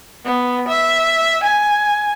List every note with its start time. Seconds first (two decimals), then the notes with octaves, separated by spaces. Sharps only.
0.25 B3
0.68 E5
1.44 G#5